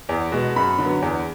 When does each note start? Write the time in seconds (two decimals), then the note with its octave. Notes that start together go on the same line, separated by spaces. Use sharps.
0.09 E2
0.32 B2 G#3
0.56 F#2 B5
0.79 D3 F#3 B3
1.02 E2